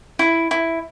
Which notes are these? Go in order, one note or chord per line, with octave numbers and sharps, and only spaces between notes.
E4
E4